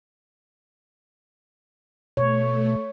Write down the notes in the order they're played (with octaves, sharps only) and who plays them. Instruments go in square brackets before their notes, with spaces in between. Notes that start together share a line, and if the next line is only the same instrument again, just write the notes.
[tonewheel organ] B2 [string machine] A3 [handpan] C#5